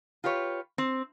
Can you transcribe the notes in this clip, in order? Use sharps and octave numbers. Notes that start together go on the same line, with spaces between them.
F4 G4 B4 C#5
C4